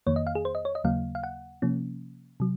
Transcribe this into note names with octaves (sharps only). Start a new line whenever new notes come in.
F2 D#3 A#3 C#5
D#5
F5
G#4
C5
D#5
C#5
D#5
D#2 C#3 F#3 A#3 F5
F5
F#5
C3 F3 A#3 C#4
C3 F#3